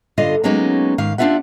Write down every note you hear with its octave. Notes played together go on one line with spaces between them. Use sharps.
G2 D3 F4 D#5
F#3 G#3 A#3 B3 C#4 D#4
G#2 D#3 F5
C4 D4 D#4 F4 E5 F#5